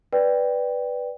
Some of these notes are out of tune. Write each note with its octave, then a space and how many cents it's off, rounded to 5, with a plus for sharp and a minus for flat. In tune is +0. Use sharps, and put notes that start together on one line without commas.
B4 +0 D5 +0 G5 +0